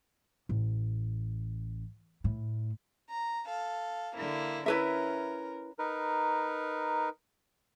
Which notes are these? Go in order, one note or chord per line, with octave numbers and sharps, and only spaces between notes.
A1
A2
A#5
A4 F5
D3 A#3 E4
C#4 E4 A#4 B4 E5
D#4 A#4 B4